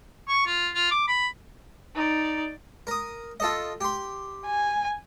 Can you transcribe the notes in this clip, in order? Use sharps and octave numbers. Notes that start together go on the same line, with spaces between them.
C#6
F4
F4
D6
B5
D#4 D5
A#4 D#6
F4 A4 D#5
G4 C6
G#5